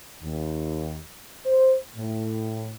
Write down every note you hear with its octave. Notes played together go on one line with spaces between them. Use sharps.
D#2
C5
A2